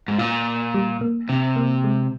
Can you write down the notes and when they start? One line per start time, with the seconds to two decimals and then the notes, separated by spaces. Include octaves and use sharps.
0.08 G#2
0.18 A#2 F4
0.74 G3
1.01 A#3
1.29 C3 C4
1.56 A#3
1.84 G#3